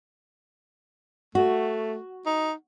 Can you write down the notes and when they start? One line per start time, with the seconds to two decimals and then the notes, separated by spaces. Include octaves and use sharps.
1.35 A3 F#4
2.26 D#4